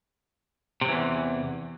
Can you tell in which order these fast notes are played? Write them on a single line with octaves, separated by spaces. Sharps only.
C3 F#3 E3 E2